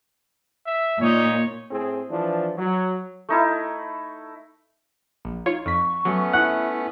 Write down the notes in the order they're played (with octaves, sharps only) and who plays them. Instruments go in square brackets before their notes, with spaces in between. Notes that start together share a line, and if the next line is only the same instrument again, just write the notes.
[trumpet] E5
[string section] A#2 [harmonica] D#4 [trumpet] C#5
[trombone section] A2 C4 G#4
E3 F3 D4
F#3
[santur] A3 D#4 E4
[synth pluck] A#1
[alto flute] D#4 [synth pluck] F4 C#5
[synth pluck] F2 B6 [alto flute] C#6
[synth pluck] F#3 [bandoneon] A3 B3 C#4
[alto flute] E4 [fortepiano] F#5